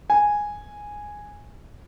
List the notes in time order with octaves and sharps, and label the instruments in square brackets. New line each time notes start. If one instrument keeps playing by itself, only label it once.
[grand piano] G#5